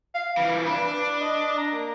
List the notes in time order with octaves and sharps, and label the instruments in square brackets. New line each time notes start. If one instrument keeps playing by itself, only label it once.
[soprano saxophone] F5
[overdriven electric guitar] E3 F3 [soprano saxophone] B5
[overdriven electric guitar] D4 [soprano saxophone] B4
[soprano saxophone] D#5
A#5
A#3